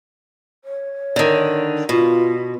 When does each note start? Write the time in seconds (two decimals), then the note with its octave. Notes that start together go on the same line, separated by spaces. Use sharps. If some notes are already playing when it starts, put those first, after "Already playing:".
0.65 C#5
1.16 D3 D#3
1.89 B2 F4